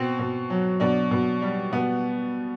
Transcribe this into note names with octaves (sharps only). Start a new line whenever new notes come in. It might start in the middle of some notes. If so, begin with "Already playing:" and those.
Already playing: B2 C4
B2
F#3
B2 D4
B2
G3
B2 B3